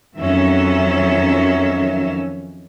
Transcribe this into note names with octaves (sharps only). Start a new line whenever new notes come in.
F2 D#3 F#3 C#4 E5